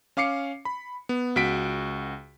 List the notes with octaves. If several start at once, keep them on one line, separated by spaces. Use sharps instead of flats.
C#4 F5 D6 C7 C#7
B5
B3
C#2 F#4 B6 D7